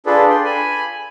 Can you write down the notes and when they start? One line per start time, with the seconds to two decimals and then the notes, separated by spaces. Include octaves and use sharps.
0.06 D4 F4 G#4 A4 B4 D5
0.29 G5 C6
0.45 G#5 B5